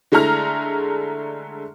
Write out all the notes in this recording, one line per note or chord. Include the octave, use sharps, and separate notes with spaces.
D3 G#3 A3 E4 A#5 F6